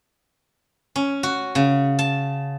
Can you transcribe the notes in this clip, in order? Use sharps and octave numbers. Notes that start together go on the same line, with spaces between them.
C#4
F#4
C#3
A5